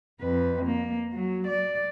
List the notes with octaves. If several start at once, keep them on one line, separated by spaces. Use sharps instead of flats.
F2 B4
A#3
F#3
D5